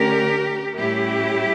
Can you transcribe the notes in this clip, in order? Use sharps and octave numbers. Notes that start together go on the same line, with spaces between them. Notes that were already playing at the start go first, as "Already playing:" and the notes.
Already playing: D3 A3 C#4 G4 A#4
A2 G3 C#4 E4 G4